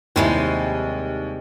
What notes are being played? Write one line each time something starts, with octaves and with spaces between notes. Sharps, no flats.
D#2 C3 G3 G#3 E4